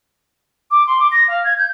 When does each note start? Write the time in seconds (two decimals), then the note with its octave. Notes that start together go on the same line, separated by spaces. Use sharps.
0.71 D6
0.87 C6
0.99 D6
1.12 A#6
1.28 F5
1.44 G#6
1.58 G6